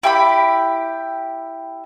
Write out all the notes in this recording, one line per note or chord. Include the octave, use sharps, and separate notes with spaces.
E4 G4 B5